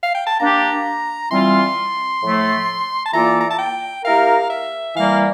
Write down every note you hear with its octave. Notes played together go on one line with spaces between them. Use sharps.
F5
G5
A5
A#3 D4 G4 A#5
E3 G3 C4 F4 C6
A2 F3 A3
A5
E3 A#3 F4 A4 D5 A#5
A#5
A5
G5
A#3 E4 G4 A#4 F5
E5
E3 G3 A#3 F5